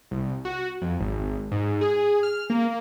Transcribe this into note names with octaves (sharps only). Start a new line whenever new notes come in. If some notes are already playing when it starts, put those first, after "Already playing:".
C2
F#4
F2
G#1
G#2
G#4
F6
A#3